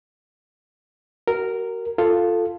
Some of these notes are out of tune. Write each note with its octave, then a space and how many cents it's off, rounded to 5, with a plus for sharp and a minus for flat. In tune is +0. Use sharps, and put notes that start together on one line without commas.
F#4 +30 A#4 -10
F4 +0 A4 +5